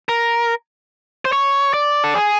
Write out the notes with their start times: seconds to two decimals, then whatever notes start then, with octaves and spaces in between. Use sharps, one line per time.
0.09 A#4
1.25 C5
1.33 C#5
1.74 D5
2.04 A4
2.15 G#4